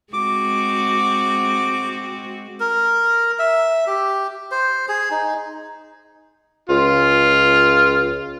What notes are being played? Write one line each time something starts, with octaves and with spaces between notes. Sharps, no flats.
G#3 C4 F#4 D6
A#4
E5
G4
C5
G#4
D#4
C#2 F4